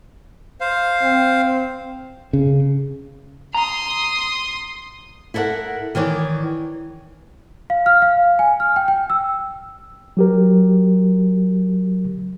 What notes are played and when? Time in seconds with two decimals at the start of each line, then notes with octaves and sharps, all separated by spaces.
0.61 C5 F5
1.02 C4
2.33 C#3
3.54 A#5 C6 D#6
5.34 E4 A4 A#4 C#5 F#5
5.95 D#3 E3 C#5 D5
7.70 F5
7.86 F6
8.02 F5
8.39 G#5
8.60 F6
8.76 G5
8.88 G5
9.10 E6
10.17 F#3 G4 A#4